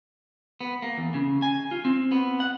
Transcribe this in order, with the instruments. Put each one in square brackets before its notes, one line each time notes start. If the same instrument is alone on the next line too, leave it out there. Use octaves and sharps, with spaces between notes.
[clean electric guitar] B3
A#3
E2
C#3
G#5
F4
C4
B3
F#5